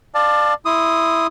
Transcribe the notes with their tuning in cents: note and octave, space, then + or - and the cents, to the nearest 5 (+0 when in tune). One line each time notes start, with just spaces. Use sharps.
D5 +20 F5 +0 A5 +0
E4 +0 C6 -10 D#6 +0